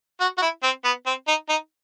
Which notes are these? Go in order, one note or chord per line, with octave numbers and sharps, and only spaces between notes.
F#4
F#4
E4
C4
B3
C4
D#4
D#4